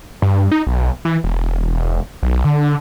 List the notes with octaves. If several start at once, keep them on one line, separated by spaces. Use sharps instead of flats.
G2
D#4
B1
E3
E1
B1
D3